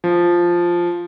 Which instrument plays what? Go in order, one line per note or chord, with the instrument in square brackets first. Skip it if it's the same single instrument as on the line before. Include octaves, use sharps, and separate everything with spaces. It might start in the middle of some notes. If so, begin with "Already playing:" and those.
[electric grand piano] F3